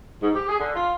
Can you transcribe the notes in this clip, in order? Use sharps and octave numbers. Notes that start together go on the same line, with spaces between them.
G#2
G4
G#4
D3
F4